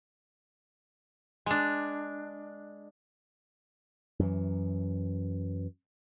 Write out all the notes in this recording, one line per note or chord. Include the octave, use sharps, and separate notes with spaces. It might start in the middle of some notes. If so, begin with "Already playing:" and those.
G#3 D4
F#2 E3